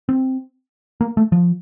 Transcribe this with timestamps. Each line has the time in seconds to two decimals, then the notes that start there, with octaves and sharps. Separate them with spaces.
0.09 C4
1.01 A#3
1.17 A3
1.32 F3